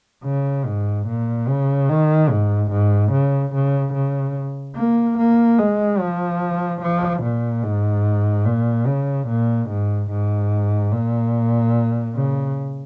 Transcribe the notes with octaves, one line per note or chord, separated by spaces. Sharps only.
C#3
G#2
A#2
C#3
D#3
G#2
G#2
C#3
C#3
C#3
A#3
A#3
G#3
F3
F3
A#2
G#2
A#2
C#3
A#2
G#2
G#2
A#2
C#3